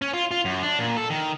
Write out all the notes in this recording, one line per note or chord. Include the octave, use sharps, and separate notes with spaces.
C#4
F4
F4
F#2
D4
A#2
A4
D#3